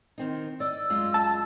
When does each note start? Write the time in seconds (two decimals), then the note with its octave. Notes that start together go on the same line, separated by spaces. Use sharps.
0.18 D#3 C4 D#4
0.60 D5 D#5 E6
0.90 F#2 G#3 F4
1.14 A5